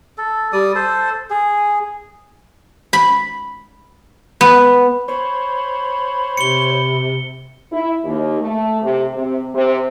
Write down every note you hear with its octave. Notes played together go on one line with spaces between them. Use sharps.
A4
G3 D5 D#6
A4 C5
G#4
B5
B3
C5 C#5 B5
C3 C#7 G7
E4
D#2
A3
C3
C3
C3